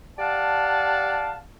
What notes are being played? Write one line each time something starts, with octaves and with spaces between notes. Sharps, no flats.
G4 D5 F5 F#5 A5